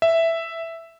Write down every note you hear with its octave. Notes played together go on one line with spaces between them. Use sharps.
E5